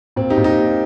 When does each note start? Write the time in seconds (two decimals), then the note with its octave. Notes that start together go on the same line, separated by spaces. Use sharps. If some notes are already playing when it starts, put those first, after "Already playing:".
0.16 A#2 C4
0.30 D#4 G4
0.37 A#2
0.44 D#4 G4
0.58 A#3